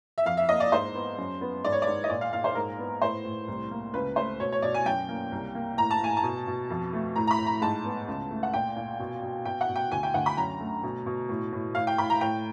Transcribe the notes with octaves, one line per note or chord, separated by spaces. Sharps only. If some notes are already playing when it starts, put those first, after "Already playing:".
E5
F2 F5
E5
A#3 D#5
D5
G#2 C5
B3
F#2
B3
G#2 D5
C#5
G#2 D5
D#5
A#2 D5
F5
A#2 F5
C5
G#2 A#4
B3
A2 C5
A2
C2
A#3
C#2 B4
A3 C5
B2 C#5
C#5
B2 D5
G#5
F#2 G5
A#3
C2
A#3
A2 A#5
A5
A2 G#5
A5
B2
B2
F2
A3
A2 A#5
A#5
B5
A2
A#5
G#2 A5
B3
C#2
A3
F#5
A#2 G5
A#2
B2
B2
B2 G5
F#5
B2
G5
D2 G#5
G5
D2 F#5
B5
F#2 A#5
A3
B2
B2
A2
A2
A2 F5
G5
A2 B5
A#5
A2 G5